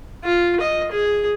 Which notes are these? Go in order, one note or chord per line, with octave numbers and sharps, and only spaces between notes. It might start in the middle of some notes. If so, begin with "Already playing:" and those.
F4
D#5
G#4